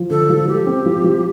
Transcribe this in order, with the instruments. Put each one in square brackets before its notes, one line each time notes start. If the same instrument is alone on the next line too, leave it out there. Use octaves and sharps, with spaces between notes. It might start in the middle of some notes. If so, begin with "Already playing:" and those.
Already playing: [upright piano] F3
[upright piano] D3 [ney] A4
[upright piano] F3
[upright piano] F3 [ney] G4
[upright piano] C4
F3
F3